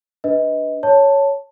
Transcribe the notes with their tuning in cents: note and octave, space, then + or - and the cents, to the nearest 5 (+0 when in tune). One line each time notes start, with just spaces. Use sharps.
D4 +0 B4 +0 D#5 +25
C#5 +5 A5 +10